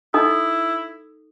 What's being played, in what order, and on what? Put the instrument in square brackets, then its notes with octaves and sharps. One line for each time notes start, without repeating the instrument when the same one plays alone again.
[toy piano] D#4 A4 D#6 [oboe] E4